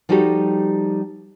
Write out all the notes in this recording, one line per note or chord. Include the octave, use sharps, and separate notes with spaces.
F3 G3 D#4 F#4 G4 A4